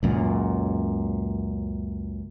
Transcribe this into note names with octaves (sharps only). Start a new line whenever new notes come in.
C#2 F#2 A#2